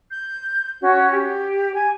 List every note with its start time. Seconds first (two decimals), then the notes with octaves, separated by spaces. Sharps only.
0.10 G6
0.81 C#4 F#4
1.11 G4
1.73 G#5